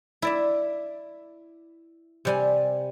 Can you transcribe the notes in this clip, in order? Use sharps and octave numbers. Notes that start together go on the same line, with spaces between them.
E4 D5 E5
C3 G3 G#5